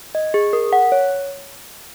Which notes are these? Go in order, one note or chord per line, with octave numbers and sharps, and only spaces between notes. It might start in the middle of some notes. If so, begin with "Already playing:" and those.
D#5
G#4
A#4
F#5
C#5